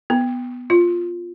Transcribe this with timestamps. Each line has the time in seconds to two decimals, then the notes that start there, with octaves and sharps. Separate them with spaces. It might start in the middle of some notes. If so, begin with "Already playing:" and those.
0.10 B3
0.70 F4